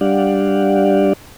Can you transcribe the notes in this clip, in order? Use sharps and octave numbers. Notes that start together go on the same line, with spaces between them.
G3 D4 G4 D5 F5 F#5